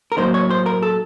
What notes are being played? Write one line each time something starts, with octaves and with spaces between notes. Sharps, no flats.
A#4
A2 F#3 A#3 D#4 C5
C#5
C5
A#4
A4